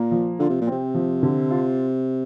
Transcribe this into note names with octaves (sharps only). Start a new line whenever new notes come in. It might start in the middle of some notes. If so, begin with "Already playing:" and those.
Already playing: A#2 A#3
F3
D3 F4
C3
A#2
C3 C4
F3
D3
F4